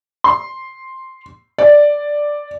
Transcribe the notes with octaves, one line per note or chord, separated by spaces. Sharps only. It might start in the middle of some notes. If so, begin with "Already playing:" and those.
C6
D5